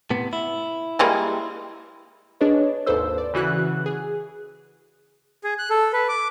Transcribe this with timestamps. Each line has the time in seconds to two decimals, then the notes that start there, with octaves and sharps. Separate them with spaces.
0.10 A2 C3 B3
0.33 E4
0.99 G3 G#3 A#3
2.41 D4 G#4 B4 C#5 D#5
2.86 G#1 D#2 A4 B4 C5 E6
3.18 D5
3.33 C#3 E3 F#4 F#6
3.86 G#4
5.44 G#4
5.59 F#6
5.70 A4
5.93 B4
6.08 D6